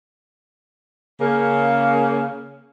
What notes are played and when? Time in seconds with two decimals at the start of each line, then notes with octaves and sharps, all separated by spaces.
1.21 C#3 A#3